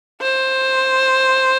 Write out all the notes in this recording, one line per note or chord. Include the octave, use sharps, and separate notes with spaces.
C5